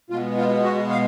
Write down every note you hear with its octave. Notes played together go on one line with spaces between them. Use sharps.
B2 G#3 B3 F4
F4
F#4
F5